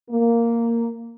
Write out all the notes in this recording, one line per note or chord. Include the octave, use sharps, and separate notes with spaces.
A#3